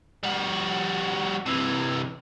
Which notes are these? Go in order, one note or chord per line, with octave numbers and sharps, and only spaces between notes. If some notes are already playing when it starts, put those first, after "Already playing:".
G3 F#4
C3 E3